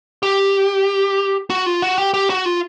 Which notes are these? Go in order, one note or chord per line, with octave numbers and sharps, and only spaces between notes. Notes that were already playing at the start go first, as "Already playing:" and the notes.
G4
F#4
F4
F#4
G4
G4
F#4
F4